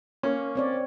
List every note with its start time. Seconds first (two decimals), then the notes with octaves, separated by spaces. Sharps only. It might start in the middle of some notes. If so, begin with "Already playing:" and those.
0.23 A#3 C#4 C#5
0.55 C4 C#5 D5